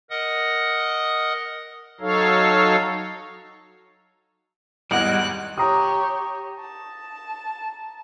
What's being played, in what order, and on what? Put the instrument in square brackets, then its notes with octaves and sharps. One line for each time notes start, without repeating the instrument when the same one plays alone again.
[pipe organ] A#4 D#5 F#5 D#6
F#3 D#4 A4 C#5 F5
[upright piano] G#1 E2 [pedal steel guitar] G3 G#3 A#4 [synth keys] D#5 F#5 [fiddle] F#6
[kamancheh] G4 C#5 [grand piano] A#5 D#6
[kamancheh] A5